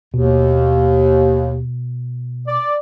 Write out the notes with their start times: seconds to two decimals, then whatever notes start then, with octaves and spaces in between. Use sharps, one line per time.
0.14 D#2 B2
2.47 D5